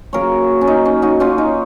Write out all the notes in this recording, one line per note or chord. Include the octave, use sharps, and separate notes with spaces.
C#3 F#3 A#3 A#4 C#5
C#4
D#4
C#4
D#4 F#4
C#4 F4
D#4